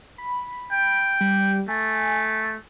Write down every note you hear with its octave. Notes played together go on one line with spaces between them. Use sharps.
B5
G5
G3
A3 G#5